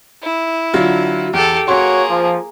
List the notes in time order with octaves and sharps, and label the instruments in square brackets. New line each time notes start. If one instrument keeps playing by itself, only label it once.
[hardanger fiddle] E4
[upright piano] D3 F#3 F4
[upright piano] E2 [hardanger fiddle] G4 A4
[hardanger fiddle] A#3 G#4 [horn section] F#4 C#5 [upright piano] C6
[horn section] F3